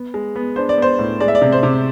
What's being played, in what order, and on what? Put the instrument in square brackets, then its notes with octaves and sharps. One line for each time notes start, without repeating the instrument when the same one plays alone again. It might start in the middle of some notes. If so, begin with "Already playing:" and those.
Already playing: [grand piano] B3
G#3
B3
D4 C5
D5
B3 C5
A2
G#3 D5
E5
D5
C3
C5
C3